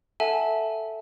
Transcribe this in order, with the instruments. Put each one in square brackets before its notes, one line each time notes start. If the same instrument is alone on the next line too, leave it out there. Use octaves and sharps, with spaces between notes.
[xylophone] A4 E5 F#5 G#5 A5